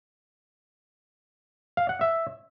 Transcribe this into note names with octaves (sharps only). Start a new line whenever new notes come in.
F5
F#5
E5